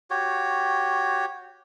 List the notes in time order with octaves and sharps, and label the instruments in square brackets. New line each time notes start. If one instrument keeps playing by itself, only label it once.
[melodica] F#4 G4 C#5